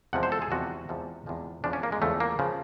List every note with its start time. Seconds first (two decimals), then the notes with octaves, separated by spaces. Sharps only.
0.13 E2 C3 F3 G#3 F#5
0.23 C5
0.32 A4
0.42 G#4
0.51 E2 C3 F3 G#3 F#4
0.89 E2 C3 F3 G#3
1.26 E2 C3 F3 G#3
1.64 E2 C#3 F3 D4
1.73 C#4
1.83 A#3
1.92 G#3
2.02 E2 C#3 F3 A3
2.20 A#3
2.39 C#3 F3